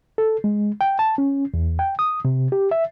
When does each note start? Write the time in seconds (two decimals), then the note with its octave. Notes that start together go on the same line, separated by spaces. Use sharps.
0.18 A4
0.44 G#3
0.81 G5
0.99 A5
1.18 C#4
1.54 E2
1.79 G5
1.99 D#6
2.25 C3
2.52 G4
2.71 E5